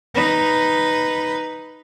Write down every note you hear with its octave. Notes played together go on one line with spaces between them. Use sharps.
D#4 B4